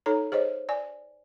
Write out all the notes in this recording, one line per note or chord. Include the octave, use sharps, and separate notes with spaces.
D#4 A4 C#5 A#5
G#4 C5 C#5 D#5
D5 G#5